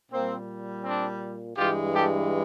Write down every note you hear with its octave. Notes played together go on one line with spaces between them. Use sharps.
A#2 G3 A#3 C4
C4 D4
G2 E3 G#3 F4 G4
G4 A4